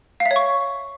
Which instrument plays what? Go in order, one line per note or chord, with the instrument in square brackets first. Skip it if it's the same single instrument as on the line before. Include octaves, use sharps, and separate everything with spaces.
[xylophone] F5
E5
C#5
C#6